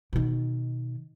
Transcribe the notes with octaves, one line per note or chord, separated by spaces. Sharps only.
B2 D#3